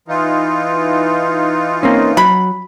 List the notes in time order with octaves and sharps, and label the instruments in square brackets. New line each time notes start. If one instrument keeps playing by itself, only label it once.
[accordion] E3 D#4 F4
[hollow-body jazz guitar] A#3 C4 C#4
[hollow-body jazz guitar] F#3 [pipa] B5